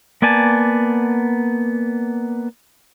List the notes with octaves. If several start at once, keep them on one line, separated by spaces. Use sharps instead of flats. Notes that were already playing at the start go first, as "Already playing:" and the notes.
A#3 B3 D5 G#5 A5